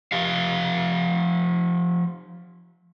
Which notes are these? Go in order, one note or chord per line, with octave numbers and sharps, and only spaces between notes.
F3 G4 F5